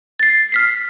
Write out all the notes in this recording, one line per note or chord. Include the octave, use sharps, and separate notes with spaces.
A6 C7
F6 B6 C7